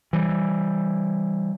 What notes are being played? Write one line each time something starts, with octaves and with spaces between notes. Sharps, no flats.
E3 G3